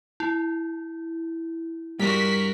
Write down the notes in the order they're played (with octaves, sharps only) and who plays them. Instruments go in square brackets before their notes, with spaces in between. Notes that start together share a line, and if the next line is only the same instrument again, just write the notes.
[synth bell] E4
[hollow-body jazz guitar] G2 [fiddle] F#4 A#4 [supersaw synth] B6